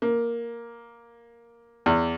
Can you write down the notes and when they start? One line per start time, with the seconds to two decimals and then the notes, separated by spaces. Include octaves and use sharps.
0.02 A#3
1.86 E2